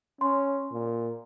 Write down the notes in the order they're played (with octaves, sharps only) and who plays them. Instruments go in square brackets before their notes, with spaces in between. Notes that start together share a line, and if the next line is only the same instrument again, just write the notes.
[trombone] C#4 [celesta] C6
[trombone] A#2